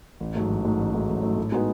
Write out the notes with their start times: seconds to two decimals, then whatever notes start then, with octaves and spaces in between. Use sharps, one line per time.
0.20 A1
0.35 G#2 F#3 A3
0.50 A1
0.65 G#2 F#3 A3
0.79 A1
0.93 G#2 F#3 A3
1.09 A1
1.23 G#2 F#3 A3
1.37 A2
1.52 G#3 B3 D#4 F#4